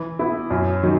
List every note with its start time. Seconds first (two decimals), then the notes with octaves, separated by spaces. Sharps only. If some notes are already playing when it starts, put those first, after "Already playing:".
Already playing: E3
0.19 B3 E4
0.51 F#2
0.83 D#3 F#3